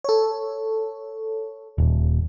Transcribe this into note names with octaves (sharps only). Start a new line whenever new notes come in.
A4 C#5
D#1